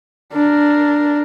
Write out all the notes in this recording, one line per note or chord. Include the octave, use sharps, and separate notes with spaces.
D4 A#4